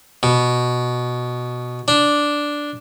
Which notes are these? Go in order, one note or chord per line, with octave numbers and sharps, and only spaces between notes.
B2
D4